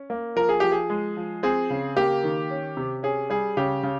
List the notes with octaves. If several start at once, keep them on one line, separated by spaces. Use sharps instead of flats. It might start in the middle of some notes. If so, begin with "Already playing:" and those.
Already playing: C#4
A#3
F3 A#4
G#4
F3 G4
G#4
G#3
F3
C4 G#4
C#3
A#3 G4
D#3
C#4
C3
C#4 G#4
G3 G#4
C#3 G4
C#3